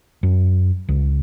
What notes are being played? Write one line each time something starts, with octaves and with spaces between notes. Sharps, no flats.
F#2
C#2